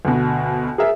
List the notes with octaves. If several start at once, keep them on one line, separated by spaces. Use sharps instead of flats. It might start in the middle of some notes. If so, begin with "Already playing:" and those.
D2 B2
G#4 A#4 E5